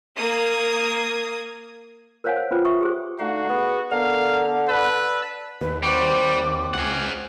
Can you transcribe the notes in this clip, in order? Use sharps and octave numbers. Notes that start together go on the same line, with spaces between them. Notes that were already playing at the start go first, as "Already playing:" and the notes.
A#3 D#6 G#6
A#4 C5 C#5 F5 F#5 G#5
C5
C#4 F4 B4 C5
E5 C#6 D#6
G4 G#4 C5
D3 A3 D#4 F#4 F5
B3 G#4
D3 B3 A#4 F5 A#5
B4 D5 A5 E6
D#2 B4
G3 C4 F#4 D6
C#2 G#4 F#5